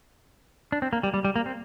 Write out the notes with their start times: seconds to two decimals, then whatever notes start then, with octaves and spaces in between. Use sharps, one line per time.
0.72 D4
0.82 C4
0.93 A#3
1.03 G3
1.14 G3
1.25 G3
1.36 A#3
1.46 C4